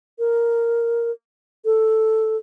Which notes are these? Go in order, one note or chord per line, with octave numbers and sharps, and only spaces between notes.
A#4
A4